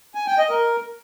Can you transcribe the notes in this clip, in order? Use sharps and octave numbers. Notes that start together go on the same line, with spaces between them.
G#5
G5
D#5
A#4